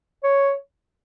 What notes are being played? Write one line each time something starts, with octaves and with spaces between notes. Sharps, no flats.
C#5